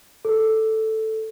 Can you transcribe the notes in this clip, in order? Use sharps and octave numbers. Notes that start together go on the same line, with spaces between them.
A4